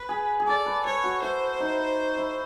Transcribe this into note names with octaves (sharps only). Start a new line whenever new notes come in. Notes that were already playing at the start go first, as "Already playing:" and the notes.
Already playing: B4
G#4
G#4
A4 D5
B4
B4 C#5
F#4
E4 C5
D#4
E4